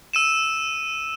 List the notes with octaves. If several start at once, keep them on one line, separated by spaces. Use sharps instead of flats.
E6 D#7 E7